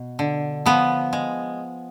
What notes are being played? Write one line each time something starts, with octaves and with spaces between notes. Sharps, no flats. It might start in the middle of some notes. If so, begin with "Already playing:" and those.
Already playing: B2
D3
F3 B3
G#3